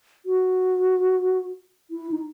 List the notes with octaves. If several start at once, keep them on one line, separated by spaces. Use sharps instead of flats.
F#4
E4
D#4